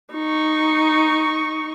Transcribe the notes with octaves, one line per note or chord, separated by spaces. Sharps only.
D#4 C#6